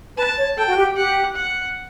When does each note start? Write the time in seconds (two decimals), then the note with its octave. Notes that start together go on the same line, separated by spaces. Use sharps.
0.17 B4 A5
0.37 C#5
0.56 A4 G5
0.67 F#4
0.76 G4
0.96 G4 F#5
1.36 F#5